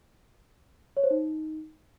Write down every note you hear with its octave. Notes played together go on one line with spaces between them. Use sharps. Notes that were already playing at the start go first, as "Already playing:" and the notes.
C#5
C5
D#4